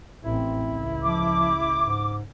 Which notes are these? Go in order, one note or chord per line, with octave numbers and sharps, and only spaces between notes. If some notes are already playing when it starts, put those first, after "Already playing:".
A1 C4 E4
C#2
F3 D6
G#2